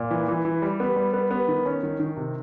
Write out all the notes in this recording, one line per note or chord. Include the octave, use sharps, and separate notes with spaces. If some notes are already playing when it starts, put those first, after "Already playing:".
Already playing: A#2
E3
E3
E3
G3
B3
G3
B3
B3
D#3
C#4
D#3
D#3
C3